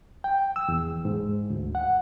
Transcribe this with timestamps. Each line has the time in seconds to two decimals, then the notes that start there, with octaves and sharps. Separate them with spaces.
0.24 G5
0.56 E6
0.68 E2
1.05 G#2
1.50 D2
1.75 F#5